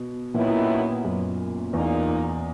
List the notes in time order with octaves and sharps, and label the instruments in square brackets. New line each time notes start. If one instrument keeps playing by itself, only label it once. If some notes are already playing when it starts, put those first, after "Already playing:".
Already playing: [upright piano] B2
[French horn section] F#2 D#3 F#3 B3 E4 [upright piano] A#2
[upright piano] F#2
[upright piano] E2 [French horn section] A#2 A#3 D#4